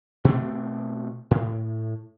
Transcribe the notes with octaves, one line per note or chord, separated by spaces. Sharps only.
B2 A3 C4
A2